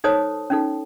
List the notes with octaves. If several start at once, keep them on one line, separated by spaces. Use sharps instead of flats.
D#4 A4 C5 C#5 A5 D#6
C#4 D#4 A4